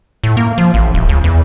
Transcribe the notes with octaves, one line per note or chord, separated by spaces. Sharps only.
A2
A#3
F3
A1
D#1
C#2
E2